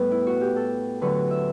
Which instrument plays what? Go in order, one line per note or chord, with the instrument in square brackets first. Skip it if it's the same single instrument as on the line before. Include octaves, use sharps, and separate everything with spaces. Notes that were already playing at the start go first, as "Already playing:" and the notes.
Already playing: [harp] A2 G3 B3 B4
E4
F#4
G4
A4
D2 D3 F#3 A3 B4
E5